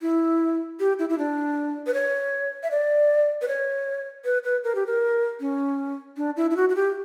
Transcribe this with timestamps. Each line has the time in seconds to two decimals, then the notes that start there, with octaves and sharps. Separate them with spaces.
0.02 E4
0.80 G4
0.99 E4
1.09 E4
1.18 D4
1.87 B4
1.94 C#5
2.63 E5
2.71 D5
3.42 B4
3.48 C#5
4.25 B4
4.44 B4
4.64 A#4
4.75 G4
4.86 A#4
5.40 C#4
6.17 D4
6.37 E4
6.51 E4
6.56 F#4
6.69 F#4
6.76 G4